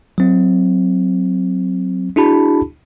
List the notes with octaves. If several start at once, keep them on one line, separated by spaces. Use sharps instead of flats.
F#3 C4
D4 E4 F#4 G#4 A5 B5